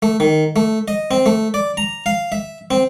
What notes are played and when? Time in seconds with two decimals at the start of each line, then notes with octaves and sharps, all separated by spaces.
0.02 A3
0.20 D#3
0.56 A3
0.88 D#5
1.11 C4
1.26 A3
1.54 D5
1.77 A#5
2.06 F5
2.32 E5
2.71 C4